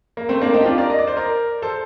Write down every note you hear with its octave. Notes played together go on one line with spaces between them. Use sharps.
A#3
A3 C4
A#3 D4
C4 D#4
G4
D4 F4
A#4 D5
D#5
D5
C5
A#4 D5
A4 C5